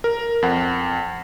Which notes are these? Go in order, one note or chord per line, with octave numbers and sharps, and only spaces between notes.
A#4
F2 F#5